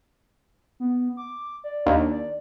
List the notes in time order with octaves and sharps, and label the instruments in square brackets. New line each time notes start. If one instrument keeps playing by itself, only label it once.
[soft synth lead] B3
D6
D5
[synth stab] D#2 [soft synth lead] D4
[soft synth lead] D5